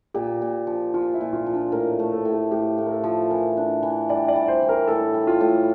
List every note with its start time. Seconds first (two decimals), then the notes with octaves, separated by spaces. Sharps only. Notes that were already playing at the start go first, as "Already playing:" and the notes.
0.14 A#2 G4
0.42 A#2
0.67 F3
0.94 F3 F4
1.14 E4
1.21 A#2
1.33 F4
1.46 F3
1.53 D4
1.72 A2 A#4
1.92 A#4
1.99 A3
2.13 A4
2.25 A2
2.32 G4
2.51 A2 G4
2.78 A2
2.86 A#4
2.91 A4
3.03 F3
3.30 E3 A#4
3.57 D4
3.83 E3
4.09 G3 D5
4.28 D5
4.35 G3
4.48 C5
4.62 E3
4.69 A#4
4.88 A2 A4
5.14 G3
5.27 F4
5.40 A2